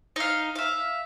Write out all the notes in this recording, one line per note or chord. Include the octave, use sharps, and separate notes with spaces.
D#4 F5
E5 F5